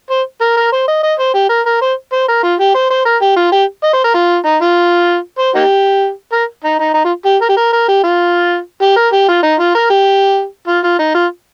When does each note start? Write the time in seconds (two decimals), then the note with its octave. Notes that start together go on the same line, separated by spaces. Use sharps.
0.10 C5
0.41 A#4
0.57 A#4
0.72 C5
0.88 D#5
1.03 D#5
1.19 C5
1.34 G4
1.49 A#4
1.66 A#4
1.82 C5
2.12 C5
2.28 A#4
2.43 F4
2.59 G4
2.75 C5
2.90 C5
3.05 A#4
3.22 G4
3.36 F4
3.52 G4
3.83 D#5
3.93 C5
4.04 A#4
4.14 F4
4.45 D#4
4.62 F4
5.39 C5
5.55 A#3 D#4 G4
6.32 A#4
6.64 D#4
6.79 D#4
6.94 D#4
7.04 F4
7.25 G4
7.41 A#4
7.49 G4
7.57 A#4
7.73 A#4
7.88 G4
8.04 F4
8.82 G4
8.96 A#4
9.13 G4
9.28 F4
9.43 D#4
9.60 F4
9.75 A#4
9.90 G4
10.68 F4
10.84 F4
10.99 D#4
11.15 F4